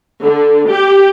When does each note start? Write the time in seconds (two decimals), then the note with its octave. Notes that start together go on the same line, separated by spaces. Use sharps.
0.23 D3
0.70 G4